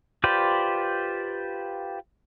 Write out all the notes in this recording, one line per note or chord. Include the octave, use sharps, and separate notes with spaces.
F4 G4 B4 C5 D5